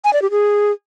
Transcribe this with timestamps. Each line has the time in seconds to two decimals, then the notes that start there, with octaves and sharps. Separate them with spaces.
0.04 G#5
0.13 D5
0.22 G4
0.31 G#4